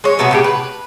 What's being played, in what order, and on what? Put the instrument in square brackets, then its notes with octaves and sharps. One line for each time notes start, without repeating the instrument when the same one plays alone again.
[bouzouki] G#3 C#5
B2 F#3 B3 E5
A2 C#3 G4
B4